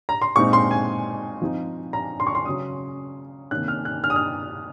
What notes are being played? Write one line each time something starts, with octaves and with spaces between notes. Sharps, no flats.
A#5
C6
A#2 G#3 C4 D#4 C#6
C6
G#5
F3 C4 D#4
A#5
C6
C#6
C6
C#3 F#3 C#4 D#6
C3 D#3 A#3 C#4 F#6
F6
F#6
F6
D#6
F6